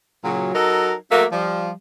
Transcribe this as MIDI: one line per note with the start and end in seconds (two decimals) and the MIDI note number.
0.24 0.53 46
0.24 0.53 49
0.24 0.53 54
0.54 0.93 54
0.54 0.93 63
0.54 0.93 69
0.54 0.93 70
1.11 1.25 54
1.11 1.25 57
1.11 1.25 58
1.32 1.71 53
1.32 1.71 55